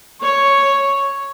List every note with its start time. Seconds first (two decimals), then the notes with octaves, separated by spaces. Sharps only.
0.23 C#5